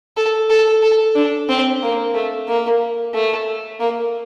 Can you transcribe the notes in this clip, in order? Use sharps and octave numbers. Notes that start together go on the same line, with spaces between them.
A4
A4
A4
D4
C4
A#3
A3
A#3
A3
A#3